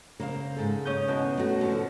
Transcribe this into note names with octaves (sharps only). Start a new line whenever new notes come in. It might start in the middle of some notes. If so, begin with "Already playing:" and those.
C#3 A#3 C5 F5
G#2 A4
C#4 D#6 G6
E2 B2
A3 A#3 F#4
D3 F3